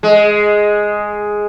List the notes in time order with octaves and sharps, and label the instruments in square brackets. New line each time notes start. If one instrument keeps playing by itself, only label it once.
[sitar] G#3